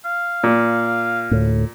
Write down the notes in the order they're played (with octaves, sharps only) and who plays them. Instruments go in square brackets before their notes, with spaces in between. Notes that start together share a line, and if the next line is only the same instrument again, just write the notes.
[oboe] F5
[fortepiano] A#2
[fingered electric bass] D2 A2